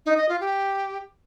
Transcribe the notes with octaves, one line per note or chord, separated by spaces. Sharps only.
D#4
D#5
F4
G4